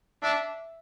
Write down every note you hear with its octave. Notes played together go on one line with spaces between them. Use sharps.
D4 E5